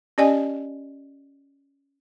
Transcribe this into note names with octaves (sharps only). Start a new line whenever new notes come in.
C#4 G4 D5 D#5 G#5